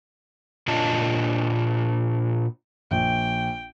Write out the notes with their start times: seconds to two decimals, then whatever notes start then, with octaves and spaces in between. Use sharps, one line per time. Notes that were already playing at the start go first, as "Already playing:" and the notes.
0.68 A#2 D4 F4 C#5 D#5 A5
2.91 A#1 G5